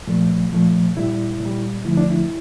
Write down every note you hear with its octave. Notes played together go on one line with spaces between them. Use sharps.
A#2 F3 A3
A#2 F3 A3
A#2 G3 E4
A#2
G3
E2 D3 F3 A3 E4
D4
E4